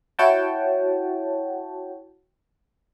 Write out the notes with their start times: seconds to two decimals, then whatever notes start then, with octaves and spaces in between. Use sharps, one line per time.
0.19 E4 F#4 C#5 F#5 G5 A5